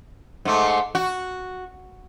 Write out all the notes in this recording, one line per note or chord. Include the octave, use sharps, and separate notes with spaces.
G#2 A3
F#4